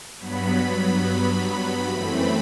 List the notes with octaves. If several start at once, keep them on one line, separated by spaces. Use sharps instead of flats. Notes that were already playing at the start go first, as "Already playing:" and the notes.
G2 F#3 B3 B5
F#2 E3 A3 C4 B5